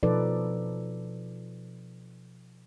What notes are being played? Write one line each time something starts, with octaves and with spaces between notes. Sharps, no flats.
B2 F3 D#4 A4 B4 D5